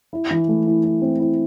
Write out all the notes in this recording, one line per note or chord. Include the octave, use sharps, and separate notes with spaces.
E4
E3
A3
E4
E4
C4
E4